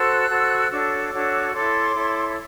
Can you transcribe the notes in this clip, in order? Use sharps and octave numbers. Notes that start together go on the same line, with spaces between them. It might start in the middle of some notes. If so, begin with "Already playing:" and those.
Already playing: F#4 A4 C5 E6 F#6
F#4 A4 C5
D4 F#4 A4 C#5 D6 E6
D4 F#4 A4 C#5
E4 A4 C#5 C6 D6
E4 A4 C#5